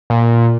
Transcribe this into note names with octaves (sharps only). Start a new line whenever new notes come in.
A#2